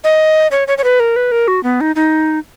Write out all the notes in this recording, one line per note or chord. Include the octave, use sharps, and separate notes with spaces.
D#5
C#5
C#5
C#5
B4
A#4
B4
A#4
F#4
B3
D#4
D#4